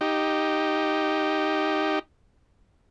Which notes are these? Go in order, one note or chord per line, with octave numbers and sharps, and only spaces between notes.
D#4 G4